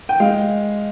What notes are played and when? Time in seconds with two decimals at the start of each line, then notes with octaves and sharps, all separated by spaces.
0.09 G5
0.20 G#3 F5